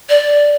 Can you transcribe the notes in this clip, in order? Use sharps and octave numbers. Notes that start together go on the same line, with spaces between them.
D5